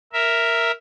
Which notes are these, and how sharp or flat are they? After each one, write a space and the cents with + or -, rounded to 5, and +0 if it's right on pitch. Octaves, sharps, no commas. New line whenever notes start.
A#4 +0 E5 +0